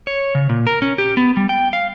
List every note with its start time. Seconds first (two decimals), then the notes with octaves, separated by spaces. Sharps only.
0.07 C#5
0.35 C#3
0.49 A#2
0.67 A#4
0.82 C#4
0.98 G4
1.17 B3
1.37 G3
1.49 G5
1.73 F5